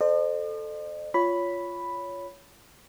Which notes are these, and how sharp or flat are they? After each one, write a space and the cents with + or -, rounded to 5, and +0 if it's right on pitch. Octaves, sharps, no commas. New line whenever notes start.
A4 +0 C5 +0 D#5 -45
F4 +0 C#5 +15 B5 +0